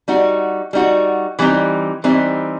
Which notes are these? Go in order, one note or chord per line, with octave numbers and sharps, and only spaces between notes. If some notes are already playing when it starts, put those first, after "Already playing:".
G3 D#4 F#4
G3 D#4 F#4
E3 G3 C4 D#4
E3 G3 C4 D#4